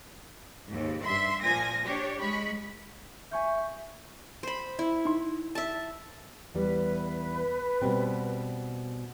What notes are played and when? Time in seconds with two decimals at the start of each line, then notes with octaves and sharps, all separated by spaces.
0.68 D#2 G#2
1.02 G2 E5 C6
1.41 A#2 F3 G#5 A#6
1.85 D4 G4 C#5
2.19 G#3 B5 C#6
3.31 E5 G#5 C#6 G6
4.43 C5 B5
4.79 E4
5.05 D#4 C6
5.55 E5 A5
6.54 E2 G3 B4
7.82 B2 G3 C4